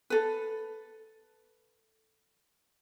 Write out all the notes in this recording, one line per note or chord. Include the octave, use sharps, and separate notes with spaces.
A4 B4